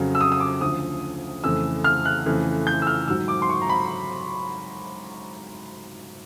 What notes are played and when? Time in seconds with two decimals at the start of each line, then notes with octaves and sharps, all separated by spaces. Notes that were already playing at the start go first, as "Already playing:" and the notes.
Already playing: F2 C#3 F#3
0.15 E6
0.21 D#6
0.32 D#6
0.40 D6
0.61 D2 C#3 F3 D#6
1.43 F2 C#3 E3 A3 E6
1.84 F6
2.05 F#6
2.26 F2 C#3 E3 A3
2.67 G6
2.82 E6
2.87 F6
3.08 G#2 D#3 F#3 E6
3.28 D6
3.42 C6
3.49 C#6
3.62 A#5
3.69 B5